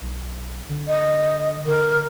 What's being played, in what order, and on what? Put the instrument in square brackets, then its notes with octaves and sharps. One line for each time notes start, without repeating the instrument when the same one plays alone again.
[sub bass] B1
D3
[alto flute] D#5
[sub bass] D3 [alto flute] A#4